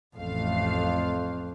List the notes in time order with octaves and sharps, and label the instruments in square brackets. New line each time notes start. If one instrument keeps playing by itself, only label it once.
[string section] A1 A3 F5 [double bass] F2